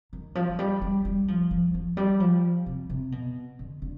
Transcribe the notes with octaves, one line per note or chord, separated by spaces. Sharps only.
D#3
F3
F3
G3
G3
G3
F3
F3
F3
G3
F3
C3
C3
B2
D3
D3